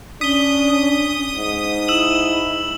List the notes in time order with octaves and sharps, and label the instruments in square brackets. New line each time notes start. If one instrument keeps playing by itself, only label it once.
[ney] C#4 [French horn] D4 [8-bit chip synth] D#6 [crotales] B6 G7
[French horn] G#2
[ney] E4 [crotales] E6 E7 F#7